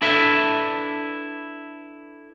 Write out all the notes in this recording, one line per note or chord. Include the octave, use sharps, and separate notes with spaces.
D4 E4 A4 B4 E5